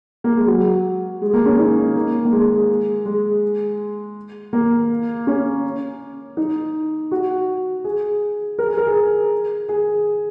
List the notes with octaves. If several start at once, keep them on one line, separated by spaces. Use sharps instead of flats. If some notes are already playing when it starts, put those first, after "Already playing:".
A#3
G#3
F#3
G#3
A#3
C#4
D#4
A#3
A#3
G#3
G#3
A#3
C#4
D#4
F#4
G#4
A#4
G#4
A#4
G#4
G#4